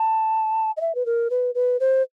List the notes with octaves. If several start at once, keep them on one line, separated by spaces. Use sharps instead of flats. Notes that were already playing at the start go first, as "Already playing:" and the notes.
Already playing: A5
D#5
E5
B4
A#4
B4
B4
C5